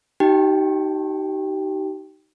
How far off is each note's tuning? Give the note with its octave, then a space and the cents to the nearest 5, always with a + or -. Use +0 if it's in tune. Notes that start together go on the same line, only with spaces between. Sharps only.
D#4 +0 G4 -40 G5 +10